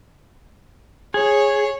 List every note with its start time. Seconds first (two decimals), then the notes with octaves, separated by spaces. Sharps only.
1.14 G#4 C#5